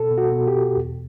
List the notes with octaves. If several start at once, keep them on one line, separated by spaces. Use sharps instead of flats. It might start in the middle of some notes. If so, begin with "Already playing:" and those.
Already playing: B2 A4
B2
F#4
B2
G4
B2
E2